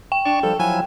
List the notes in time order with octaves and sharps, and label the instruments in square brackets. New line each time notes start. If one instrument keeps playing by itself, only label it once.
[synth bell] G5
[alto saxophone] D4 [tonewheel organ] D5 C#6
[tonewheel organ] F3 G3 [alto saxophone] A4
[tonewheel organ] F3 F#3 E4 [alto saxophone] G#5